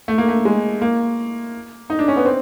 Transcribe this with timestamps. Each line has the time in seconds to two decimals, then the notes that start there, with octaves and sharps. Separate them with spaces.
0.08 A3
0.18 A#3
0.28 A3
0.45 G#3
0.82 A#3
1.90 D#4
1.99 D4
2.08 C#4
2.16 B3
2.26 C4